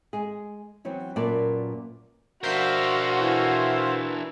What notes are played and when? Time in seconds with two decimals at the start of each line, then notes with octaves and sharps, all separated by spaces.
0.13 G#3 G#4
0.85 E3 F#3 B3 C4
1.16 F#2 A#2 B4 D5 A5
2.43 D4 F#4 A#4 C5 E5 F5
3.21 E3